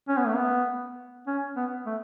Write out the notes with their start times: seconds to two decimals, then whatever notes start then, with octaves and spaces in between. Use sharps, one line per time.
0.08 C#4
0.17 B3
0.26 A3
0.36 B3
1.27 C#4
1.57 B3
1.86 A3